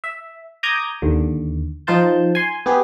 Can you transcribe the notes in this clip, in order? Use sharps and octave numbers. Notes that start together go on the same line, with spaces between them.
E5
A#5 D6 D#6 G6 G#6
D#2 D3
F3 D#4 F4 C5 A5 G6
G#5 C6
B3 G4 G#4